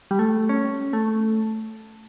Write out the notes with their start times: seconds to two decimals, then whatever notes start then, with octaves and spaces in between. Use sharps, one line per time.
0.11 G3
0.19 A3
0.49 C#4
0.93 A3